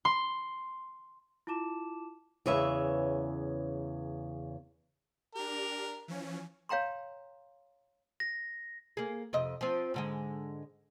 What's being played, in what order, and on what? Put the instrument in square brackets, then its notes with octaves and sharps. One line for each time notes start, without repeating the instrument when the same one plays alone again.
[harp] C6
[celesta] E4 F4 A5 D6 E7
[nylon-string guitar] E2 C#3 B4 C#5 E5
[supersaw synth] D4 G4 [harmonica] A#4
[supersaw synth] E3 F3 C#4
[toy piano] C#5 F5 G5 A#5 C6
[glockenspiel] A#6
[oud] A#3 G#4
F2 C3 D#5
F3 C4
G#2 D3 G#3